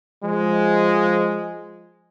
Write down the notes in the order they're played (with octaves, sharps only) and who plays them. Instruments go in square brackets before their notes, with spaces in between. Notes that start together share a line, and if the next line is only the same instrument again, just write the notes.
[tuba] F3 [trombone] G#3